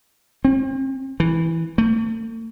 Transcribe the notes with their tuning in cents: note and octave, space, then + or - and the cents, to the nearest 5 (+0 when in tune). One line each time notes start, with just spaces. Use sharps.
C4 +40
E3 -5
A3 +40